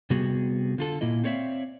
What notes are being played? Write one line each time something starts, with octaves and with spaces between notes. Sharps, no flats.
C3 G3 B3 F#4 G#4
D3 F4 A4
A#2 A#3 E4 D#5
C4 A4 C#5 D5 E5 F5